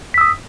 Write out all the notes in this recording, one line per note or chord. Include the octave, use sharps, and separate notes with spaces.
D#6 E6 B6